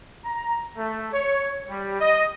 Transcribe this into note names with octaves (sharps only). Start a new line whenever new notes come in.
A#5
A3
C#5
G3
D#5